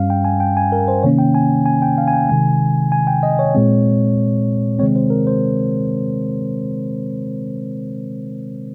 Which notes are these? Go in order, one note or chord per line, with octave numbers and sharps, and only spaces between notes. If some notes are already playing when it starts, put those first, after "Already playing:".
Already playing: G2 G3 C#4 F5
G5
G#5
G5
G#5
A#4
C5
C3 D#3 A#3 C#4 C#5
G5
G#5
G#5
G5
F5
G#5
G5
C3 D#3 G#3 G#5
G#5
G5
D#5
C#5
A#2 G#3 C4
C3 D#3 G#3 C4 C#5
C5
A#4
C5